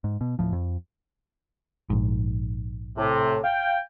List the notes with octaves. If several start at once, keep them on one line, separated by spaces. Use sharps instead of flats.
G#2
B2
D1 G#1 A2 F3
F2
A#1 G#2
A2 C3
F5 G5